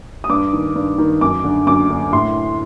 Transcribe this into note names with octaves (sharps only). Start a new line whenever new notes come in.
D#6
G2 D6
D#3
G2
D#3
F#2 D6
D3
F#2 D6
D3
A2 C6